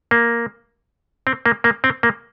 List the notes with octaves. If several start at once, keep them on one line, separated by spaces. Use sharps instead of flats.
A#3
C4
A#3
A#3
C4
A#3